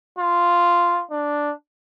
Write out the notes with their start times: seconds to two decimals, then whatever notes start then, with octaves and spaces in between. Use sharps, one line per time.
0.19 F4
1.11 D4